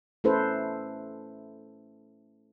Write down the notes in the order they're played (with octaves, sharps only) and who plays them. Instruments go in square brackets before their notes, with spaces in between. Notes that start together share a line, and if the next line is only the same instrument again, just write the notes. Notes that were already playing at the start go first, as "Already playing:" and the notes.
[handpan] A3 C#4 E4 A4 B4 C5